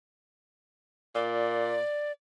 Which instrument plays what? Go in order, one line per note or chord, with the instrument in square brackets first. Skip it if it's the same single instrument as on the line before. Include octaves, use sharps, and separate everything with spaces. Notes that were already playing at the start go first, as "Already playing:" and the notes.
[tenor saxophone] A#2 [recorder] D5